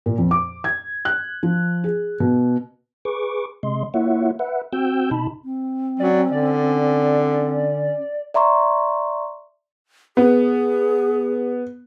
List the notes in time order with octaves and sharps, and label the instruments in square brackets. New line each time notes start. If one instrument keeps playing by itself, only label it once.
[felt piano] A#2
F2
D6
G#6
F#6
F3
G#4
B2
[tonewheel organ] G#4 B4 C#6 D6
C3 G#3 D#5 C6
A#3 E4 F4 C#5 E5 F#5
B4 E5 F#5
C4 F#4 G5 E6 G6
B2 D#4 A5 B5
[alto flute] C4
[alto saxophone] F#3 [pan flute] C#4 [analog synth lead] D5
[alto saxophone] D3 [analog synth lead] D5
[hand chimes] D5 E5 A#5 C6 C#6
[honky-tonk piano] B3 [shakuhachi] G#4